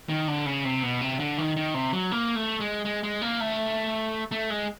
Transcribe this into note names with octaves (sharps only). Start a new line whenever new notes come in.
D#3
D3
C#3
C3
B2
C3
D3
D#3
D#3
C3
F#3
A#3
A3
G#3
G#3
G#3
A#3
A3
A3
G#3